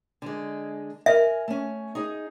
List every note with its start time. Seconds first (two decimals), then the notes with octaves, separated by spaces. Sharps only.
0.22 D3 G#3
1.06 A#4 E5 G#5
1.48 A3 C#4
1.95 D#4 G#4